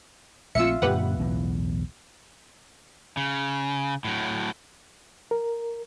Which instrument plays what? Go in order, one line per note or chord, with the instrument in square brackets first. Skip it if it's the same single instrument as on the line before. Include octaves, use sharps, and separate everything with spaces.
[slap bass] A#1 A3 C4 [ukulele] F4 E5 [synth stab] E6 C#7
[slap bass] F#2 A#2 D3 [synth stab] G4 B4 F#5
[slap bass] B1 E2 A2
[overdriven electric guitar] C#3
A2 F#3
[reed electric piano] A#4